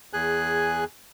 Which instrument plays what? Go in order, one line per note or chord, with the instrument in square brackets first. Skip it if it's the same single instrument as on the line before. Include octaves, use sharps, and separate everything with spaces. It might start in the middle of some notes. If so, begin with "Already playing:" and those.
[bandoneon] E2 G#4 G#5 F#6